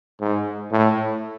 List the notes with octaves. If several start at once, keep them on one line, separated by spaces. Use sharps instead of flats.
G#2
A2